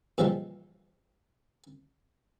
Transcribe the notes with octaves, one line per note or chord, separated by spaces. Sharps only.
A#2 C#3 E3 F3 G3 G#3